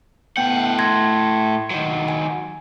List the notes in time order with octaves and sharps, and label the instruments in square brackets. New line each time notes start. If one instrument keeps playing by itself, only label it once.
[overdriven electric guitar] A2 F#5 [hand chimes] B3 G5 G6
[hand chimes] C6 G#6 A#6
[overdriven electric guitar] D#3 F#3
[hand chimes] G#5